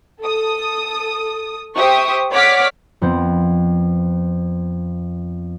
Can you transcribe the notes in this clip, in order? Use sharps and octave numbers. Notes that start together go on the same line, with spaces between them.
A4 D#6
G4 C5 E5 C#6 D#6
C#5 D5 F#5 D6 F6 B6
F2 B3 C4